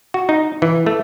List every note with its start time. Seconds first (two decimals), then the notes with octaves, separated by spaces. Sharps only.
0.14 F#4
0.29 D#4
0.62 E3
0.86 A3